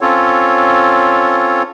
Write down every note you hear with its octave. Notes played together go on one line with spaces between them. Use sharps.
C4 C#4 F4 A4 C#5